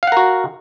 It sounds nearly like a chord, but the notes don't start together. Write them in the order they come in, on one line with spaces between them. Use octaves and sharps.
F5 F#5 A#4 F#4